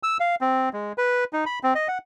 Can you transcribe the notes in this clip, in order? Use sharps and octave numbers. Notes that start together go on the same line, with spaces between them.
E6
F5
C4
G#3
B4
D#4
B5
C4
D#5
F#5